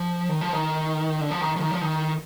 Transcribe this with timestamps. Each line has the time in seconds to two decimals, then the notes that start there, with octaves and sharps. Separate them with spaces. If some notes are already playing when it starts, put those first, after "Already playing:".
Already playing: F3
0.29 D#3
0.41 F3
0.53 D#3
1.21 D3
1.31 F3
1.41 D#3
1.56 F3
1.60 D#3
1.71 F3
1.81 D#3